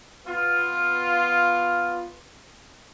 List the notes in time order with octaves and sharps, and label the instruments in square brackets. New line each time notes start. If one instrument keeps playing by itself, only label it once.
[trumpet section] B3 F4